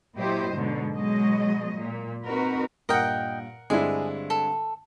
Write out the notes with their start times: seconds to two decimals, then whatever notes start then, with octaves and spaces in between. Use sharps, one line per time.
0.17 A#2 F#3 E4 G4 C5 D#5
0.53 G#2 B2 D3 F#3
0.93 B2 F#3 G#3 D#5
1.76 A#2
2.25 C4 D#4 F#4 A#4 B4
2.89 G2 A#2 A#4 D#5 F#5 G5
3.70 G2 D3 G#3 C4 D4 E4 G#4
4.30 A4